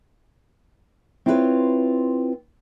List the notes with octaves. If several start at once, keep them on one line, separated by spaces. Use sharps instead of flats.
C4 E4 F4 G4 B4 C#5